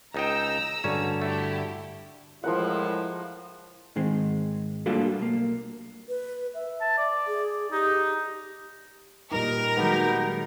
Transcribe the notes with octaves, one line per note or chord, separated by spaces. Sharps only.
C#2 D#4 G5 A#5 E6
G2 D3 C#4 F#4
A3 E4 G4
A2 F3 G#3 E4 A#4 F#5
G#2 D#3 G#3 C4
G3 A#3 D4 F4 F#4 A4
B1 A#3
B4
E5
A5
D5
G#4
D#4 G4
A#2 G3 D#4 A#4
D#3 F#3 G#3 B3 D#4 G4